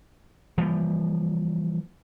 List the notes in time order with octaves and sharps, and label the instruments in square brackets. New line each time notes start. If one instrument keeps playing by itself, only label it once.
[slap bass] E3 F3 G3 A#3